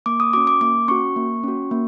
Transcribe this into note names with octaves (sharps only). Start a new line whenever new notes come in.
A#3 D6
D#6
C#4 F#4 D6
D6
A#3 D6
C#4 F#4 C#6
A#3
C#4 F#4
A#3